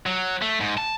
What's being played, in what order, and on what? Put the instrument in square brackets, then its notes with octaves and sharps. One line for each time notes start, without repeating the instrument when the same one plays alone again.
[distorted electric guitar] F#3
A3
G#2
A5